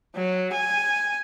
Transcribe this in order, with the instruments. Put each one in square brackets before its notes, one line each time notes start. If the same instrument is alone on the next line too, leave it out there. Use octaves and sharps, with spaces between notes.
[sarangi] F#3
G#5